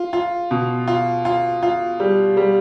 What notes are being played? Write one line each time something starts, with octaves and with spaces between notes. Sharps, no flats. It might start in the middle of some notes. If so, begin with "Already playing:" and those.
Already playing: F4
F4
B2
F4
F4
F4
G3
G3